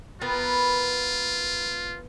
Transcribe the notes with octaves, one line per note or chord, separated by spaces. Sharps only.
B3 F4 A#4 B4